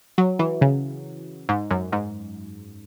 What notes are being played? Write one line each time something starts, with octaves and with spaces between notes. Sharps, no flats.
F#3
E3
C#3
G#2
F#2
G#2